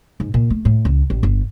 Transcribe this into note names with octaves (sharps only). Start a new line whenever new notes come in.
G#2
A#2
A3
A2
C#2
A1
G1